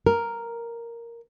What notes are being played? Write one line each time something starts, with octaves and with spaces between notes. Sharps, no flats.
A#4